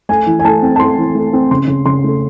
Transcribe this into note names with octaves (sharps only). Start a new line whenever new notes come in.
A3 G#5
E3
G#5
A3 A5
C4
A5
A3 C6
E3
A3
C4
C#3 C6
C#3
C#3 C6
A3